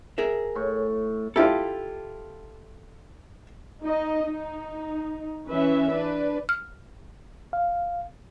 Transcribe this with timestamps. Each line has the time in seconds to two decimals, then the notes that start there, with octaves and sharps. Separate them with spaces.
0.18 G#4 A#4 E5
0.55 A2 C#6
1.36 E4 F4 G4 A4
3.82 D#4 D#5
4.26 D#4
5.50 E3 C#4 B4 E5
5.90 D4 B4
6.49 F6
7.53 F5